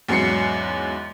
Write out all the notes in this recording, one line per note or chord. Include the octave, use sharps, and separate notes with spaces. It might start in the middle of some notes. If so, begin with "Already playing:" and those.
E2 G#2 F#3 C#4 C7 C#7